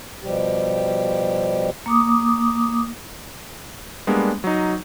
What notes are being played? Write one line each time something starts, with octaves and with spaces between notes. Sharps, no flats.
B2 F3 G3 G4
A#3 D6 D#6
G3 G#3 A#3 B3 D4
F#3 D#4